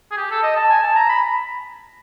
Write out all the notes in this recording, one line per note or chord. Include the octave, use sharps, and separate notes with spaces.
G#4
G4
A4
D#5
A5
G#5
A5
A#5
B5